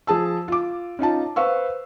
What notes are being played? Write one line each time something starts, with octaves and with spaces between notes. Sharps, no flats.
F3 G#4 A5 E6
F4 D6
C#4 D#4 F4 A5
B4 C5 F5 C#6 E6